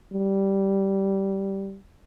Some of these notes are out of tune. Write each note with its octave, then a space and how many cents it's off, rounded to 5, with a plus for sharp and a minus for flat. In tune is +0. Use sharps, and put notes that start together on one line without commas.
G3 -10